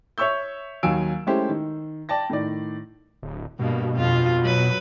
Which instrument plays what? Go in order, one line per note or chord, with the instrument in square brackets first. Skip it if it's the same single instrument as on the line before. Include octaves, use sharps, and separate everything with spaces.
[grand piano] C#5 E5 C#6 E6 G6
D#2 F#3 F5 G#5 E6 D7
G#3 A3 C#4 E4 G4 C5
D#3
D5 G5 A5 A#6
A2 D#3 D5
[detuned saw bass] D1
[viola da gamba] G2 A#3 [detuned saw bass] B2
[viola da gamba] F2 F4
F#3 B4